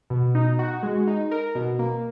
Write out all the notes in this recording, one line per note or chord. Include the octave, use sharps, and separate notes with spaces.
B2
D#4
F#4
G#3
D#4
A#4
B2
A#3